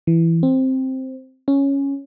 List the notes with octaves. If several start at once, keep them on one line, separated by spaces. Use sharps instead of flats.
E3
C4
C#4